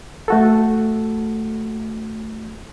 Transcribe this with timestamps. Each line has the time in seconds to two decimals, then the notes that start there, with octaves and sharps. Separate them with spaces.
0.28 A3 F#4 A4